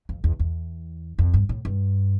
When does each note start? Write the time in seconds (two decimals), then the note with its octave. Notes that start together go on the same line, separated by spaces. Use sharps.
0.09 F2
0.24 E2
0.39 E2
1.19 F2
1.34 G2
1.49 A2
1.65 G2